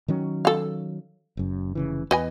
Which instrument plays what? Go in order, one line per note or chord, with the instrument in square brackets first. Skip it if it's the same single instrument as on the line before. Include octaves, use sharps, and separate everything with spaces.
[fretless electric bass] D#3 F#3 C#4
[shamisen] A4 F5
[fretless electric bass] F#1 F#2
F1 C#3 E3
[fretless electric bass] E2 [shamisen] B4 D#5 G#5